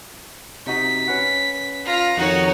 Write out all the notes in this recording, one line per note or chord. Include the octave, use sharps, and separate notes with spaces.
C3 D#4 F#4 B6
C#4 B4 F#5
F4 A#5
F2 D#3 D#4 F#4 C#5